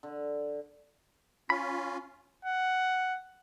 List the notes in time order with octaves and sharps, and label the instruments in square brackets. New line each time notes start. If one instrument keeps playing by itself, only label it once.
[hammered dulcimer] D3
[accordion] C#4 F4 [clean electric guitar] B5
[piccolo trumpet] F#5